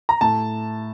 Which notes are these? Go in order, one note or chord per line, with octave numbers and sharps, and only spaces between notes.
A#5
A2 A5